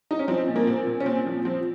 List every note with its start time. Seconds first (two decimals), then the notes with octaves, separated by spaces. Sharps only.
0.11 D#4
0.19 C#4
0.28 F3 C4
0.48 A#2
0.56 A#3
0.67 A#2 C4
0.87 A#2
1.00 C#4
1.06 A#2 C4
1.26 F3
1.45 F3 C4